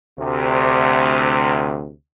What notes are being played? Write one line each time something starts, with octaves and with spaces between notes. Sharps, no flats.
D2 C3